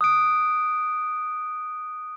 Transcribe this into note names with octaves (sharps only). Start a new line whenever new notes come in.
D#6 F#6 D7